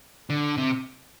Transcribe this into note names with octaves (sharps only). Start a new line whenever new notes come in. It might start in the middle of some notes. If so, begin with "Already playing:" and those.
D3
C3